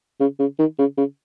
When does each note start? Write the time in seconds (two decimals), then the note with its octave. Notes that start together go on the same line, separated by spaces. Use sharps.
0.20 C#3
0.39 C#3
0.59 D#3
0.79 C#3
0.98 C#3